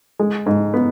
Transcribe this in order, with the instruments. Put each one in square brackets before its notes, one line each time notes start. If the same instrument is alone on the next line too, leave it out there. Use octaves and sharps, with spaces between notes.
[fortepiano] G#3
G#2
B3